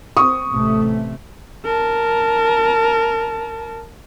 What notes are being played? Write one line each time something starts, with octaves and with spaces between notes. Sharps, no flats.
C4 C#6 D#6
A1 C3 A3
A#4 A5